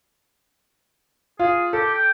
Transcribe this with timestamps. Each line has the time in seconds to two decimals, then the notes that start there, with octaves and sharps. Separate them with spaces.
1.39 F4 G#4
1.73 G4 A4
1.94 G5